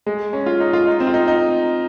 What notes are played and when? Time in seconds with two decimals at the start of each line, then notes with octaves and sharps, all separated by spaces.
0.06 G#3
0.33 C#4
0.46 F4
0.60 D#4
0.73 F4
0.87 D#4
1.00 C4
1.07 F4
1.14 D#4
1.28 D#4